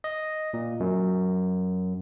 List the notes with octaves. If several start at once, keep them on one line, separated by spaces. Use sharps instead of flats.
D#5
A#2
F#2